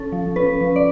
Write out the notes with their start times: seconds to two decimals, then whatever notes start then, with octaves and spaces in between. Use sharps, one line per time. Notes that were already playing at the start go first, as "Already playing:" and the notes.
Already playing: C#4 A4
0.12 F3
0.36 C#4 B4
0.61 F3
0.76 D5